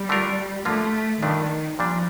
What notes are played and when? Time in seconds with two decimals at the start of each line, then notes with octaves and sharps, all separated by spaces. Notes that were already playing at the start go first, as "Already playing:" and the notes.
Already playing: G3
0.09 D3 A3 D4 F4 A#4
0.65 D3 F3 A3 A#3 F4
1.22 G2 D#3 F3 A3 D4
1.79 A#2 F3 G3 D4